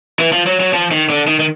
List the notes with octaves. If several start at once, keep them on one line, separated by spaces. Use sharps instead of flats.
E3
F3
F#3
F#3
F3
D#3
D3
D#3
D#3